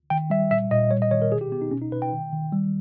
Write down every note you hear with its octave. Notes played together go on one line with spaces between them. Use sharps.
D#3 G5
G3 E5
A#2 E5
A#2 D#5
G3 C#5
D#5
D#3 C#5
A#4
B2 G#4
G4
B3 G4
D#4
B2 C#4
D#4
B2 B4
G5
D#3
D#3
G3